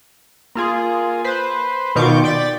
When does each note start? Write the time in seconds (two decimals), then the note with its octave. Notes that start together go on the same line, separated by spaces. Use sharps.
0.55 A#3 F4 G#4
1.24 B4 C5
1.95 B2 D#3 F4 C#6 D6 G6
2.24 D5 G5 A6 B6